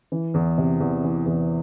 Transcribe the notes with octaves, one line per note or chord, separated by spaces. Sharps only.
E3
E2
C3
E2
E3
E2